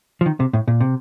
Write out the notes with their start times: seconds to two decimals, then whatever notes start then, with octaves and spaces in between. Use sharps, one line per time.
0.21 F3
0.26 D#3
0.40 C3
0.53 A2
0.68 A#2
0.80 C3